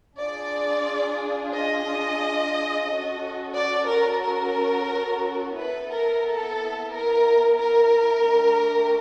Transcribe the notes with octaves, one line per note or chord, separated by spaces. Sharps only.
D4 F4 G#4 D5
D#5
C#4 F#4 A4
D5
A#4
A#4
B3 E4 A4 B4
A#4
A4
A#4
A#4
A3 D4 G4